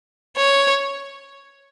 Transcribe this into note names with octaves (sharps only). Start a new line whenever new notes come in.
C#5